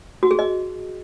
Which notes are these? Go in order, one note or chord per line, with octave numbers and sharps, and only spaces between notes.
F#4
G#4
D#5